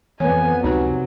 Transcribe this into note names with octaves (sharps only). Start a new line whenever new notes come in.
F2 E3 B3 C#5 G#5
C#2 C3 F#3 D#4 B4